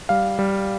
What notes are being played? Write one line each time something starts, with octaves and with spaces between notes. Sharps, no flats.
G3 F5
G3